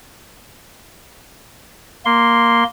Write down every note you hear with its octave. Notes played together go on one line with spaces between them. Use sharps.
A#3 C6